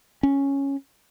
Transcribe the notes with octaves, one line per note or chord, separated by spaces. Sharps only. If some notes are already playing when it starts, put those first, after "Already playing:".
C#4